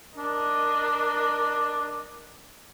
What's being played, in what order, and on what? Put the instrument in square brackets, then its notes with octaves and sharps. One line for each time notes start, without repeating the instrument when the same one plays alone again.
[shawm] D4 [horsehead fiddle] A#4 D#5